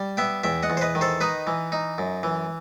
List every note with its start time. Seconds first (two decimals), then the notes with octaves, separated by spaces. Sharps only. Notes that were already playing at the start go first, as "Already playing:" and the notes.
Already playing: G3
0.17 B3 E5 G5
0.44 E2 E5 G5
0.63 D#5 F#5
0.70 E2
0.77 C5
0.81 B4 D#5
0.95 D#3
1.01 A4 C5
1.21 D#4 B4 D#5
1.47 E3
1.72 D#4
1.98 F#2
2.23 E3